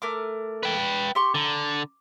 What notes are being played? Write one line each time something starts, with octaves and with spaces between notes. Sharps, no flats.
A3 A#4 D6
B4 G5
G4 C6 C#6
D3 A#5